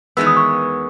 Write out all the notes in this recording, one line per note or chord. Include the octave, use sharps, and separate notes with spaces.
E2 D#3 G#3 B3 E6
D#6
C#6